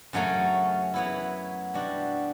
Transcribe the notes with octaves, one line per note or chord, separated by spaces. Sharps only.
F#2 C#3 F#3 A3 C#4
F#3 B3 E4
B2 G3 D4 F#4